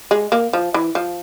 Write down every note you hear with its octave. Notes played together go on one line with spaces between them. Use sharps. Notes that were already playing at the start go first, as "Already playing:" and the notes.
G#3
A#3
F3
E3
F3